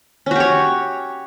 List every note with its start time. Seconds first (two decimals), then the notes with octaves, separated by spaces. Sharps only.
0.26 C#4
0.31 F#4
0.36 G4
0.40 C#5